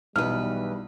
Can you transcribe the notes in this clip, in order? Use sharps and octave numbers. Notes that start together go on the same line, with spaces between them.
B1 E2 G3 B4 F6